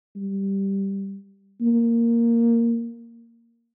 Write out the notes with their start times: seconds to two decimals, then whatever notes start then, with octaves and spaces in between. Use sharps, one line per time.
0.16 G3
1.61 A#3